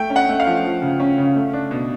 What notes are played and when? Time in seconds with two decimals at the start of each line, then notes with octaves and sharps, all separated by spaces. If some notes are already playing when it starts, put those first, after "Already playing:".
Already playing: A3 G5
0.10 C#4
0.16 F#5
0.29 A3
0.40 F5
0.47 F3
0.64 F3
0.82 C#3
1.00 C#4
1.18 C#3
1.36 A3
1.53 D4
1.71 B2